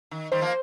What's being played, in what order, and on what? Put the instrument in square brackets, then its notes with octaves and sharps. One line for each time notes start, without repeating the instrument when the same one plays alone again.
[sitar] D#3
[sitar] D#3 G3 [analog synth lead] C5
[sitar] F3 A#3